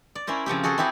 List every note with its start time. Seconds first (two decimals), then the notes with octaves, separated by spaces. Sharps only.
0.15 D5
0.27 C#4 E4 A#4 C5
0.46 C#3 F3 C4 G4
0.63 F#4 G#4 A4 C5
0.78 C4 E4 G4 G#4 C5